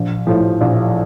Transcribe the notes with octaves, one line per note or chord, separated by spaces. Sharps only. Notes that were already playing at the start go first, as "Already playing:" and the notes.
Already playing: A#1
A2 F3
A#1